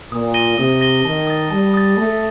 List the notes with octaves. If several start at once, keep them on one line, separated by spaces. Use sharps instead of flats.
A#2 D#6
A#6 D#7 G7
C3 D#6
A#6 D#7 G7
D#3 A5
D#6 A6
G3 A5
D#6 A6
A3 A5